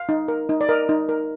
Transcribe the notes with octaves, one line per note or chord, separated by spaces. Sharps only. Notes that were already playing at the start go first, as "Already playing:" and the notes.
Already playing: F5
D#4
A#4
D#4
D5
A#4 D#5
D#4
A#4